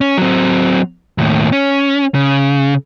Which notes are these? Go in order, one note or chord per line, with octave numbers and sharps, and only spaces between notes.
C#4
F#3 C4
D#2 A2
C#4
C#3